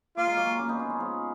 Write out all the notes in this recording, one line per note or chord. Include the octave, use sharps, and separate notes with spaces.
A#3 F4
G#3
F#3 A#3
A#3 C#4
B3 D#4
C#4 F4
C#4 F4
F3 G#3